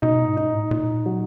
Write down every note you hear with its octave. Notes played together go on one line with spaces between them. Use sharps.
B2 D#4
G#2
D#4
A2
A#2 D#4
F#3